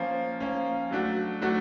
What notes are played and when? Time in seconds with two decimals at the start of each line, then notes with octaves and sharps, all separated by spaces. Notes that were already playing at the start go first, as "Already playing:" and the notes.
Already playing: F3 A#3 C#4
0.40 F3 A#3 C#4
0.91 F#3 A3 D4 F#4
1.42 F#3 A3 D4 F#4